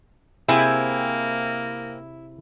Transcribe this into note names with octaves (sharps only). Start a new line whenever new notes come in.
C3 A#3 C4 E4 G#4 G#5